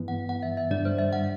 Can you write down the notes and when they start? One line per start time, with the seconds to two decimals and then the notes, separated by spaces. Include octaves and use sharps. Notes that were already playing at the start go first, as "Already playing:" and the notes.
Already playing: G2 E3 B3
0.08 F#5
0.29 F#5
0.43 E5
0.57 E5
0.71 G2 D3 G3 D4 D5
0.85 C5
0.99 E5
1.13 F#5